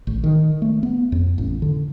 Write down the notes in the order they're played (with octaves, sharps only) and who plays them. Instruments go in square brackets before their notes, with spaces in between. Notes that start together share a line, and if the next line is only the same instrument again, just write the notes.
[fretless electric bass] A1
D#3
A3
B3
F2
A1
D3